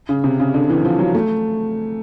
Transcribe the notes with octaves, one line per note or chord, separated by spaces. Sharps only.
C#3
C3
C#3
D3
E3
F3
F#3
A3